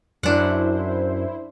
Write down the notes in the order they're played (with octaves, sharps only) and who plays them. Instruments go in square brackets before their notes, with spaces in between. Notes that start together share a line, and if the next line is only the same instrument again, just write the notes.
[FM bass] F#2 [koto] D4 F#5 [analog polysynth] E4 C5